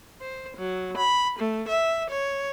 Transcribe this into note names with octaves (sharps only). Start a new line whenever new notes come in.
C5
F#3
B5
A3
E5
C#5